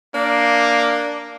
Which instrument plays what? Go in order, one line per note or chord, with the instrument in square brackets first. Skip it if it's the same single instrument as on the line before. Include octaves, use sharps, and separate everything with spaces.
[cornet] A#3 [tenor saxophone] D4